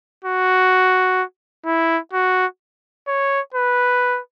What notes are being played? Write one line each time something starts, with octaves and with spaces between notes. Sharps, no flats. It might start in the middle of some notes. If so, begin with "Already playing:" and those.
F#4
E4
F#4
C#5
B4